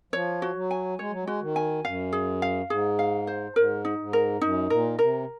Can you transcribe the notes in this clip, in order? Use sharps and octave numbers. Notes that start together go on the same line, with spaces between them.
F3 C#5
F#4
F#3
G#5
G#3 C#5
F#3
G#3 F#4
D#3
G#5
F#2 F5
G#4
F5
G#2 G#4
F5
C5
G#2 A#4
D#4
G#2
A#4
F#2 D#4
A#2 A#4
C3 A#4